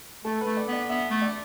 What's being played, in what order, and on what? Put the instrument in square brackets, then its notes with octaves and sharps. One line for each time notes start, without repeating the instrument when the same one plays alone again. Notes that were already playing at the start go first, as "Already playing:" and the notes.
[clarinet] A3 [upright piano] A4
[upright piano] B4
[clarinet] A3
[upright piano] D5
[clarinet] B3 [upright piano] D5
[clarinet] B3 [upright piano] E5
[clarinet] A3
[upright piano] D5